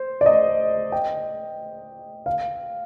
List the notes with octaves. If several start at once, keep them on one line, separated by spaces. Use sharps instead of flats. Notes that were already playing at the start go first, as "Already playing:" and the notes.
Already playing: C5
D5
D#5
G5
F5